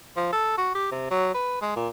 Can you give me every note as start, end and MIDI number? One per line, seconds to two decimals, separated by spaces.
0.16 0.32 53
0.32 0.57 69
0.58 0.73 66
0.75 0.88 67
0.92 1.09 48
1.11 1.32 54
1.34 1.58 71
1.61 1.74 56
1.76 1.88 46